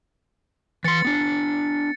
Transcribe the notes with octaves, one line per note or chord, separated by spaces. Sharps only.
E3 C6 A6 C#7
B3 D4